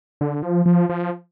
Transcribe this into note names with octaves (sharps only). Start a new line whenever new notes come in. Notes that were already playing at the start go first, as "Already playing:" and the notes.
D3
F3
F3
F3